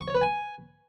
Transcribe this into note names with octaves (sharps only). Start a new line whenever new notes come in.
C#6
C#5
B4
G#5